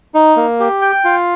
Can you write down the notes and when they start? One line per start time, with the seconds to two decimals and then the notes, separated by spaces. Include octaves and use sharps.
0.14 D#4
0.37 A#3
0.60 G4
0.82 G5
1.04 F4